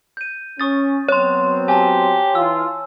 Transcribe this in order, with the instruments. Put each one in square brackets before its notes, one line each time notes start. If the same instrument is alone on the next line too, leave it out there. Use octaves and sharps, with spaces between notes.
[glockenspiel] G6 D#7
[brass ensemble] C#4 [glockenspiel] C#6 D#6 A6
[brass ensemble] F#3 B3 C4 [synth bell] C#5 C6
[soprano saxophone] G4 [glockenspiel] G#5 A5
[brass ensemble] E3 F4 [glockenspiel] E6